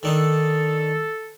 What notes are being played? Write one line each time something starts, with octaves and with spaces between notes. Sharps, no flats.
D#3 D4 D#4 A4